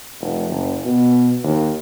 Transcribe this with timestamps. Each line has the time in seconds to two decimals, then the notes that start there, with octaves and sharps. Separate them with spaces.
0.20 F1
0.50 F#1
0.85 B2
1.44 D#2